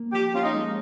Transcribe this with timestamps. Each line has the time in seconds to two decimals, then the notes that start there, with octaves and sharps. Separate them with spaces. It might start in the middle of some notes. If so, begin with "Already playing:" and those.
Already playing: A#3
0.13 F3 G4
0.34 C#4 F4
0.43 D#4
0.53 G#3